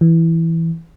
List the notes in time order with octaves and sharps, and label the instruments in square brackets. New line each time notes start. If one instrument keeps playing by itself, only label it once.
[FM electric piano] E3